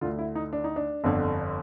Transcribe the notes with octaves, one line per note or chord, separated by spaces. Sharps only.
D2 D3 F4
E4
D#4
D4
D#4
D4
G1 F2 D3